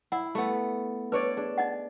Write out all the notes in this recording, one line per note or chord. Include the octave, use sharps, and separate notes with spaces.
E4 F#5
A3 B3
D4 B4 C#5 D5
D4 G#4
D#4 D#5 F#5